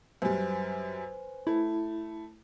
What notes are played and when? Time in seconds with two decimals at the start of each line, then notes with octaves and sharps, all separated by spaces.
0.22 F#2 G3 B4 C5 G#5
1.47 A3 E4